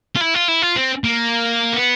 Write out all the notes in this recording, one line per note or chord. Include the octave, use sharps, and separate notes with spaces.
F4
E4
F4
E4
F4
C4
A#3
B3